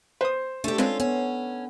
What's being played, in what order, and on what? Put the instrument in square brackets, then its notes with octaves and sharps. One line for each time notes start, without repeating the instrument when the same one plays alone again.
[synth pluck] B4 D#6 [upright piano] C5
[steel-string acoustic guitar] A3 G4 [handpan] D4 A4
[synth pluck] G#3 C4 B4 [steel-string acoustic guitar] C#4 F4
[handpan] B3 [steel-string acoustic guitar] C#4